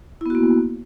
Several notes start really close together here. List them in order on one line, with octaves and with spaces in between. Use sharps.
E4 B3 F#4 A#3